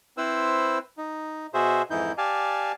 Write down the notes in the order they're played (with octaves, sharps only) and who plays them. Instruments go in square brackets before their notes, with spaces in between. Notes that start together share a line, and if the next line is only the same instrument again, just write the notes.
[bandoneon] C4 E4 B4 C5 E6
D#4
B2 F#4 G#4 C5 E5
F2 G#2 E3 D#4 E4 G6
G4 D5 F5 G#5 A5